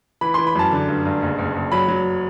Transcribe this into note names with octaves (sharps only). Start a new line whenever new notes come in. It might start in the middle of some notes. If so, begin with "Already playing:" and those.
E3 B5
E3 C6
B5
F#2 A5
D3
G2
G2
F#1
F#1
F#1
F#3 B5
F#3